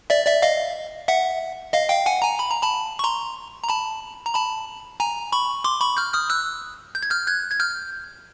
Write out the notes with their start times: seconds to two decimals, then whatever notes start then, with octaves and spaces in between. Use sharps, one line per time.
0.10 D5 E5
0.27 D5 E5
0.42 D#5 F5
1.08 E5 F#5
1.73 D#5 F5
1.89 F5 G5
2.06 F#5 G#5
2.22 G#5 A#5
2.39 B5
2.50 A#5
2.63 A5 B5
2.99 C#6
3.04 A#5 C6
3.63 A#5
3.69 A5 B5
4.26 A#5
4.35 A5 B5
5.00 G#5 A#5
5.32 B5 C#6
5.64 C6 D6
5.80 B5 C#6
5.97 F6 G6
6.14 D#6 F6
6.30 E6 F#6
6.95 G6
7.03 G#6
7.10 F6 G6
7.27 F#6 G#6
7.51 G#6
7.60 F6 G6